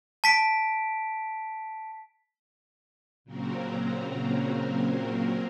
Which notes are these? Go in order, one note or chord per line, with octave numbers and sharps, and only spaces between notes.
A5 B6 D7
A#2 C#3 F#3 A#3 C4 A#4